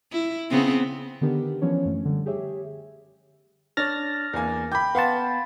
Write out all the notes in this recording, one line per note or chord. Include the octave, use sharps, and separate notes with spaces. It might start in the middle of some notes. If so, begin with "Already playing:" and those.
E4
C#3 B3 C4
D3 D#3 B3 D4 G4 A#4
E3 F3 B3 C#4 D4 C#5
F#2 A3
D3 G3
G4 G#4 C#5 E5
D4 C#5 F6 A6 A#6
E2 A#3 G#5
G5 B5 D6 G6
B3 F5 F#5 A5 C6